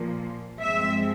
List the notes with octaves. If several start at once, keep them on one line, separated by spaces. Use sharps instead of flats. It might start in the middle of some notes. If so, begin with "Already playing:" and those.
Already playing: A#2 F3 A#3
G2 F3 G#3 C4 E5